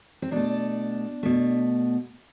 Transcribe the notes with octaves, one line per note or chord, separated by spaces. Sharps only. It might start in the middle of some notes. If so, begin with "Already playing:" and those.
C4
B2 A3 D4
B2 A3